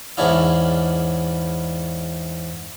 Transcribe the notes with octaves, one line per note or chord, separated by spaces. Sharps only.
E2 G#2 C#4 D4 E4 F5